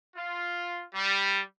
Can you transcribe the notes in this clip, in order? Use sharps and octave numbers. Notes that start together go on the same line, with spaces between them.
F4
G3